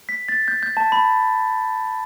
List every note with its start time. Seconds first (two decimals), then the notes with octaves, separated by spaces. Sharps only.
0.09 B6
0.29 A6
0.48 G6
0.63 G6
0.77 A5
0.92 B5